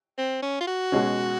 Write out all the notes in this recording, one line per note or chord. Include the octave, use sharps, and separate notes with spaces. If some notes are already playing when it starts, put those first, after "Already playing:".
C4
C#4
F4
F#4
B2 G#3 C#4